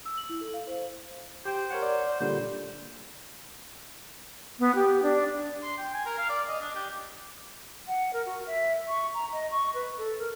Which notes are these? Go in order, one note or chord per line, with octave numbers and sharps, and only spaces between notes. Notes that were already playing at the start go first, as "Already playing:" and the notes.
E6
F#7
E4
A4
F5
C5
G4 C5 G5
A#4 C#5 F#5
D5
A#2 D3 G3 C5
B3
G4
D4
C6
G5
G#5
A#4
F5
D5
D#5
D4
G4
F#5
A#4
F#4
E5
C#6
A#5
D#5
C#6
B4
A4
A#4